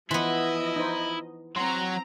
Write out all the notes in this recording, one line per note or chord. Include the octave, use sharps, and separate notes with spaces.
E3 F3 B3 E4 D#5 C6
D#4 C5
F#3 C4 F#4 A#5 C6